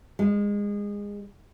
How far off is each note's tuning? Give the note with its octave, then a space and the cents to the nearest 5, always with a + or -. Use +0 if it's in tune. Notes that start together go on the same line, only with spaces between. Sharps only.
G#3 -25